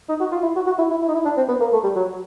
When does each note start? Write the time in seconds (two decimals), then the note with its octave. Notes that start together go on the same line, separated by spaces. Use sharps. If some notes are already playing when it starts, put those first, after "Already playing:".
0.09 D#4
0.20 F#4
0.32 F4
0.43 E4
0.56 F#4
0.66 F#4
0.79 E4
0.91 E4
1.02 E4
1.08 D#4
1.14 E4
1.25 D4
1.37 C4
1.49 B3
1.60 A#3
1.73 A3
1.83 G3
1.96 F#3